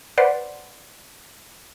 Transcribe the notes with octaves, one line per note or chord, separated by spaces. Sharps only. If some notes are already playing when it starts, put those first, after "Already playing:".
B4 C5 D5 F#5 B5 C6